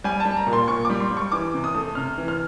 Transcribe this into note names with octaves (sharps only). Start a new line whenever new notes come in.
G3 G#5
A5
G3
A#5
A#2
C6
A#2 C#6
G3 D6
C6
G3
C#6
E3 D6
C3
D#6
A3
C3 F6
E3
F6